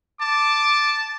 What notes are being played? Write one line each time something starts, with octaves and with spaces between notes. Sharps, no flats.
A5 D6